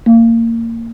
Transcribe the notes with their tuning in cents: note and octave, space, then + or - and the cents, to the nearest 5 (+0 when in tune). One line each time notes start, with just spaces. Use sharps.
A#3 -25